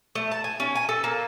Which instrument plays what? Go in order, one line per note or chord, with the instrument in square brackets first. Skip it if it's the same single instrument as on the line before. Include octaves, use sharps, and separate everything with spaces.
[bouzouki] A3
A5
G#5
C#4
G#5
A4
A#3